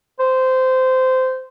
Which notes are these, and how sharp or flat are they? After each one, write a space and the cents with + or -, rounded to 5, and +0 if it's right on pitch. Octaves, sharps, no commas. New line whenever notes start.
C5 -15